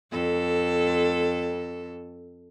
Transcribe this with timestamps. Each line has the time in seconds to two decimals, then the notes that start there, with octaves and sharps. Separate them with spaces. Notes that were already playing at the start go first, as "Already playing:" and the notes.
0.12 F2 A4